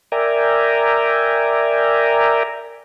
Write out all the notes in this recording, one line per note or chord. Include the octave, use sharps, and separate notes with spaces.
A#4 D5 E5 G5 G#5 A#5